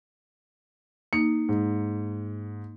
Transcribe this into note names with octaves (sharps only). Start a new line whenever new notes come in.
A#3 D#4 C#7
G#2